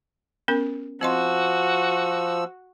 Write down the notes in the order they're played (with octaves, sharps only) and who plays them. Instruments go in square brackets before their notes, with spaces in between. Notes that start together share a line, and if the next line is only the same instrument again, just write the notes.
[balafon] B3 C#4 A#4
[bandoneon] F3 E6 [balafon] C4 D#5 C6 [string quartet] F#4